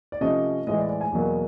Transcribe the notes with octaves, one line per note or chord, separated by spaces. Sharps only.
D5
C3 F3 A3 C#4 D#5
A2 E3 G#3 D#5
D5
D5
G#5
E2 B2 F#3 A#3